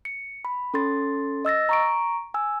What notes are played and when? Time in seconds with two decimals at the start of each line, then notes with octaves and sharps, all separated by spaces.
0.05 C#7
0.45 B5
0.74 C#4 A4 C6 A6
1.45 D#5 E6 A6 A#6
1.69 A#5 C#6 D7
2.34 G#5 E6